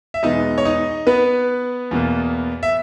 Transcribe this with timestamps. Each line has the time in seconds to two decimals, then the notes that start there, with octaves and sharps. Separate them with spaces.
0.14 E5
0.23 E2 B2 G#3 B3 D#4 D#5
0.58 C#5
0.65 D#4 D#5
1.07 B3 B4
1.91 E2 B2 A#3
2.63 E5